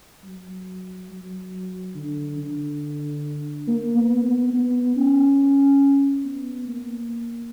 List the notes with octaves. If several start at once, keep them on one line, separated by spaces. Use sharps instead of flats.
F#3
F#3
D3
D3
A#3
B3
B3
B3
C#4
B3
A#3